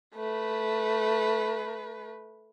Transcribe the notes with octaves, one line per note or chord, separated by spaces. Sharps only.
A3 B4